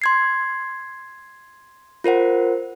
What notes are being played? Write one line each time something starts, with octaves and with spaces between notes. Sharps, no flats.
C6 G#6 C7
F4 A#4 C5 F#5